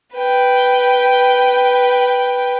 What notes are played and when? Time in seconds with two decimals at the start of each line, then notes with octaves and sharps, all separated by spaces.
0.16 B4 G5